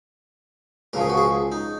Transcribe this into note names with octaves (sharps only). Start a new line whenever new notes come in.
C#2 C#3 F3 A#4
G#4
F#4
G#4
D#4